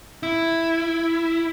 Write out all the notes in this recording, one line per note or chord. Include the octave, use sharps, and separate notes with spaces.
E4